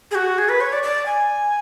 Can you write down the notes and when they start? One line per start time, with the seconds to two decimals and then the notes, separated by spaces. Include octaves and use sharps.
0.11 G#4
0.15 F#4
0.38 G#4
0.49 B4
0.61 C#5
0.72 D5
0.83 D5
1.06 G#5